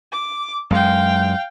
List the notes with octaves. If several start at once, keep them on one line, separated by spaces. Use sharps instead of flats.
D6
F#2 G#3 F5 G5